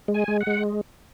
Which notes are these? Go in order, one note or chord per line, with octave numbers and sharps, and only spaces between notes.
G#3
G#5
G#3
F#5
G#3